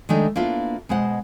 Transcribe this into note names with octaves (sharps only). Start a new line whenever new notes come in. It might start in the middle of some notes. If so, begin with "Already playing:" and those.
D#3 G#3 A3 D4 D#4
A#3 B3 D4 E4 F4
B2 G#3 C5 F#5